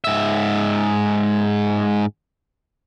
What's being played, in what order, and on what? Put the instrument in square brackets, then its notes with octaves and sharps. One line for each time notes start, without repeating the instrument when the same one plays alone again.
[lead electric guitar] G#2 E5